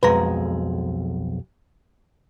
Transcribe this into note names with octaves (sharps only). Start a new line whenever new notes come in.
B1 F2 G#3 B4 A#5